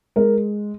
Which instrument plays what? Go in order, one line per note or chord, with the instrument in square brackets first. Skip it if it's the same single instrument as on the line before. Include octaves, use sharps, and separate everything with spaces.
[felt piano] G#3 A#4